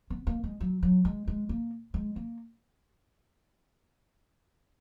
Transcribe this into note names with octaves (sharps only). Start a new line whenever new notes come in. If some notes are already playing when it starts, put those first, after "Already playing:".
B3
A#3
G#3
F#3
F#3
G#3
G#3
A#3
G#3
A#3